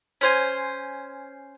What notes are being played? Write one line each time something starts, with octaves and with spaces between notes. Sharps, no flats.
C#4 C5 G#5